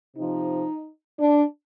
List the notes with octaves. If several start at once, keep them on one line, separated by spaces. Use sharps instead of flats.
C3 F3 D#4
D4